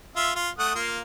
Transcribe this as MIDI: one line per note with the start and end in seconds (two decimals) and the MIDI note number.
0.16 0.31 65
0.16 0.31 76
0.36 0.50 65
0.59 0.75 57
0.59 0.75 78
0.59 0.75 87
0.75 1.01 58
0.75 1.01 65